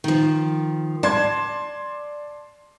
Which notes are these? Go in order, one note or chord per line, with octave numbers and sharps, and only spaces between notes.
D#3 F3
D5 A5 C6 G#6